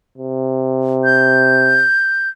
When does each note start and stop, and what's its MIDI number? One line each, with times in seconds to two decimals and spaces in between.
0.18 1.85 48
1.04 2.29 91